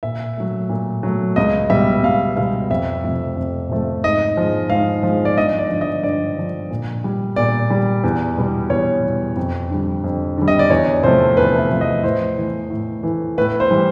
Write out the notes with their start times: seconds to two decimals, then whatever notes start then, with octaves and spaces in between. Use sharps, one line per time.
0.03 A#2 E5
0.37 F#3 A3
0.69 A#2
1.03 F#3 A3
1.36 C#2 D#5
1.70 B2 G3 E5
2.03 C#2 F5
2.36 B2 G3 F5
2.70 F2 E5
3.04 C3 F3 A3
3.36 F2
3.70 C3 F3 A3
4.04 G#2 D#5
4.37 F3 G#3
4.70 G#2 F5
5.03 F3 G#3
5.25 D5
5.37 G2 D#5
5.59 D5
5.70 D3 F3
5.81 D#5
6.03 G2 D5
6.37 D3 F3
6.71 A#2
7.04 G3
7.36 A#2 D5
7.70 G3
8.04 E2
8.38 B2 G3
8.70 E2 C#5
9.04 B2 G3
9.36 F2
9.70 D3 G3
10.04 F2
10.37 D3 G3
10.48 D#5
10.59 D5
10.70 E2 C#5
11.03 C3 F3 A3 C5
11.37 E2 B4
11.59 E5
11.70 C3 F3 A3
11.81 D#5
12.03 A2 C5
12.38 E3 A3
12.70 A2
13.03 E3 A3
13.38 A2 B4
13.60 C5
13.71 E3 G3